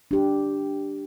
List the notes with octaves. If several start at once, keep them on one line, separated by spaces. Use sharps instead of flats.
D4 G4